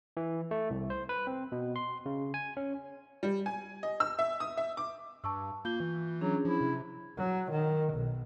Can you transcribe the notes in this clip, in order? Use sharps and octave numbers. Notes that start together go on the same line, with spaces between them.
E3
A3
C2
C5
B4
C4
B2
C6
C#3
G#5
C#4
G3
G#5
D#5
E6
E5
D#6
E5
D6
G2 A5 C#6 E6
A#3 F4 G6 G7
E3
F#3 C#4 D4 G#4
F3 E4
C3
F#3
D#3
B1